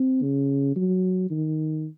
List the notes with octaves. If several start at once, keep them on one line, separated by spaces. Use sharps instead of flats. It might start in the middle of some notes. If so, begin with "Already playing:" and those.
Already playing: C4
C#3
F#3
D#3